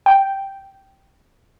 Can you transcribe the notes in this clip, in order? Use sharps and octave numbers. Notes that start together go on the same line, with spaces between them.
G5